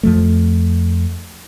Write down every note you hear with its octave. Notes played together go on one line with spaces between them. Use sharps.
F2 F3 A3